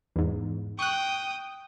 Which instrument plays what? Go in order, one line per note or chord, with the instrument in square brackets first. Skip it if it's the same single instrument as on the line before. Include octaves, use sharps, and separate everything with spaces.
[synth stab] E2 G#2
[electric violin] G5 D#6 [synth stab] C#6 F#6